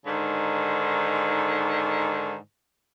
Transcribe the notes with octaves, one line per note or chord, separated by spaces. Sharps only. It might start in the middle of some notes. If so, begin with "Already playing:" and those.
G#2 D3 D#3